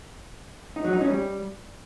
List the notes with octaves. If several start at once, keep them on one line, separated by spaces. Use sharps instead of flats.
D#4
F#3
D#4
C#4
G3